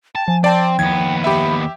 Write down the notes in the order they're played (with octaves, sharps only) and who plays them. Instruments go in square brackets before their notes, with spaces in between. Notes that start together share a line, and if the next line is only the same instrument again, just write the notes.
[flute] G5 [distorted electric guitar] A5
[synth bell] F3 [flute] G#5
[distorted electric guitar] C4 [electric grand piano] D5 A5 [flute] G5
[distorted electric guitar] D#2 B3 [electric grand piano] G#6
[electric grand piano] G4 E5 [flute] B5